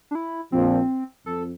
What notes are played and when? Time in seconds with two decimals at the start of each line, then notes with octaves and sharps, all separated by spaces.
0.11 D4
0.15 E4
0.52 A#1 A#2 F3 C4
1.26 F2 A4